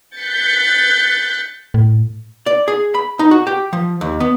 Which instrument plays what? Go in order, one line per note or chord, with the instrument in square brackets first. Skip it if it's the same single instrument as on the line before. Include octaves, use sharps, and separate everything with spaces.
[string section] F#6 G6 A6 B6 C#7
[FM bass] A2
[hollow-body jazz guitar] D5
G#4
B5
D#4
F#4
G4
F3
D#2
B3